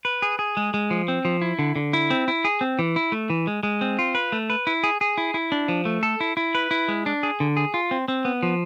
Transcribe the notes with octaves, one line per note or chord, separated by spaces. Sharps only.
B4
G#4
G#4
G#3
G#3
F3
C4
F3
E4
D3
D3
E4
C4
E4
G#4
C4
E3
E4
A3
E3
G#3
G#3
C4
F4
B4
A3
B4
E4
G#4
G#4
E4
E4
D4
F3
A3
A4
E4
E4
B4
E4
G#3
D4
G#4
D3
G#4
F4
C4
C4
B3
F3